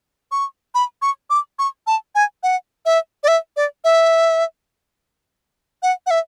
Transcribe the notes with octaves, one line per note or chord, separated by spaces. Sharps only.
C#6
B5
C#6
D6
C#6
A5
G#5
F#5
E5
D5
E5
D5
E5
F#5
F#5
E5